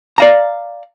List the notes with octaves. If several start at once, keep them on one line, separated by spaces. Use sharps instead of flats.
D5 F5 A#5